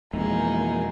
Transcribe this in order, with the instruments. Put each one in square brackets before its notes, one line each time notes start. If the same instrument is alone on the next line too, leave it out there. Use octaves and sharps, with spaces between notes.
[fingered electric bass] F2 B2 [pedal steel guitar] E3 A#3 [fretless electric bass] G#3 [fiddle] D#4 G#4